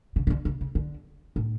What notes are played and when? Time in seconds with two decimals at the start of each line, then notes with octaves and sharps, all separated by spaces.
0.16 C#3
0.27 D#3
0.30 D3
0.45 C#3
0.61 C#3
0.75 D3
1.36 A2